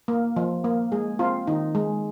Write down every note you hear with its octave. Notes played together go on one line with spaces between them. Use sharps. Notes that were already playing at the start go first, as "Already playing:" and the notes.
A#3
F3
A#3
G#3 G#4
C4 F4
D#3 D#4
G#3